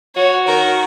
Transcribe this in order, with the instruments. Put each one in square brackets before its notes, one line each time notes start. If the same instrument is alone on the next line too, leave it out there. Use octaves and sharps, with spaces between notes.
[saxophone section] F#4 [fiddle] C#5
[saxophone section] D#3 [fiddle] A#4